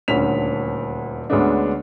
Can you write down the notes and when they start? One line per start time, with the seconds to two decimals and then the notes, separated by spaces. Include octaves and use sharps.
0.08 D#1 D2 D3 C#4 B6 F7
1.30 D2 D3 G#3 B3 C#4 D4